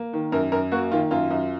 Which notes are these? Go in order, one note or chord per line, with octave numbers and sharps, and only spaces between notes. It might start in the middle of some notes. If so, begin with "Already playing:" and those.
Already playing: A#3
D#3
F#2 A#4
F#2 A#4
A#3 F#4
D#3 F4
F#2 F4
F#2